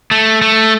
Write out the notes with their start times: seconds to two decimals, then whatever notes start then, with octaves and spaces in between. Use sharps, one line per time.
0.11 A3
0.42 A3